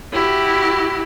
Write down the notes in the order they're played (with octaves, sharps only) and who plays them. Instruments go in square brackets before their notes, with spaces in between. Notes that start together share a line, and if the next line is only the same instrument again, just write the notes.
[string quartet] E4 F#4 G4